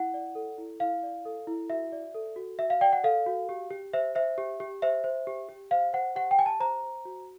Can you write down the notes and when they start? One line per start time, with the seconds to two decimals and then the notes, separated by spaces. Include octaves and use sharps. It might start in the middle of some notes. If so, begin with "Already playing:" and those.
Already playing: E4 F#5
0.14 D5
0.35 A4
0.58 E4
0.80 E4 F5
1.03 D5
1.25 A4
1.47 E4
1.70 F#4 E5
1.92 D5
2.15 A4
2.36 F#4
2.58 F#4 E5
2.70 F5
2.81 D5 G5
2.93 F#5
3.04 A4 F5
3.26 F#4
3.49 G4
3.71 G4
3.94 C5 E5
4.15 C5 E5
4.38 G4
4.60 G4
4.82 C5 E5
5.04 C5
5.27 G4
5.49 G4
5.71 C5 F5
5.93 C5 F#5
6.16 G4 F#5
6.31 G5
6.38 G4 G#5
6.46 A5
6.60 C5 A#5
6.83 C5
7.05 F#4